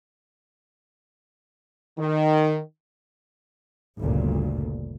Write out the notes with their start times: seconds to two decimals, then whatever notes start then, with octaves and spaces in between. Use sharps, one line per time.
1.98 D#3
3.99 G1 D2 A#2 C#3